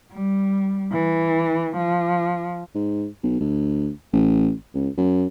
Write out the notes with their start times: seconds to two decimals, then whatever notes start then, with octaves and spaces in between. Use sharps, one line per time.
0.13 G3
0.92 E3
1.77 F3
2.75 G#2
3.23 B1
3.40 D2
4.13 A1
4.74 C#2
4.97 F#2